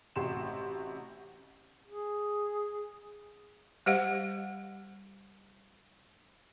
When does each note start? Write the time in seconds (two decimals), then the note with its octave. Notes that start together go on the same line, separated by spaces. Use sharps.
0.16 A1 C3 F#4 C6 E7
1.88 G#4
3.86 G3 G4 C5 D#5 F5 F#5